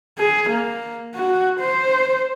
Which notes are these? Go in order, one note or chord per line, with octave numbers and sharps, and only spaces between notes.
G#4
A#3
F#4
C5